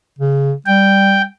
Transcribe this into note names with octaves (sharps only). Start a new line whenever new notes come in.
C#3
G3 G5